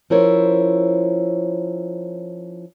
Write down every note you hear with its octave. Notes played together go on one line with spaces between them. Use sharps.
F3 C#4 E4 A#4 C5 C#5